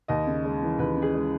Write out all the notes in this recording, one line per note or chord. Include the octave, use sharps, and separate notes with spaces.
D#2 D#5
C#3
G#3
E3
D#2 B4
C#3
G#4
G#3